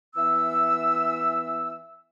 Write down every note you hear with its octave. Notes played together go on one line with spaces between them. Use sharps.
E3 B3 E5 E6